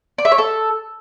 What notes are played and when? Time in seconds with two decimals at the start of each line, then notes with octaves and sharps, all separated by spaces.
0.18 D5
0.25 E5
0.32 C#5
0.38 A4